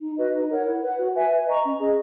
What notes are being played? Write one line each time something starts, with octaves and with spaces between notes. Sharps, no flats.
D#4
F#4 B4 D#5
D#4
A#4 C#5 F#5
E4
B4 F#5
F#4
B4 E5 G#5
B4
D#5 A#5 C#6
C#4
G#4 D#5